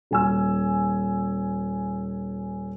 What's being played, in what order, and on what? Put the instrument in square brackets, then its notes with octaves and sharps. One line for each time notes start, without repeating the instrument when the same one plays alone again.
[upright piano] D#1 G#5 E6